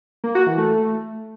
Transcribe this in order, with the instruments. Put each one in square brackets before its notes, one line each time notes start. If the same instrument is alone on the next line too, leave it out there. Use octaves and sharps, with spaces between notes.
[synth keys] A#3
F#4
E3
A3